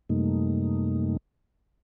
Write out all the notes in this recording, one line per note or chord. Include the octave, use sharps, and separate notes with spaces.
F#2 C3 G3 A3 A#3 D#4